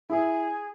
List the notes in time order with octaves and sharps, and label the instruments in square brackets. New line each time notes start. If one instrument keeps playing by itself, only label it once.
[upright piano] E4 [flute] G#4